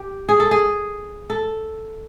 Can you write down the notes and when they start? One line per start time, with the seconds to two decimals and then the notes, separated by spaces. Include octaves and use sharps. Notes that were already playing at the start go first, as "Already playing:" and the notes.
Already playing: G4
0.29 G#4
0.40 A4
0.51 G#4
1.30 A4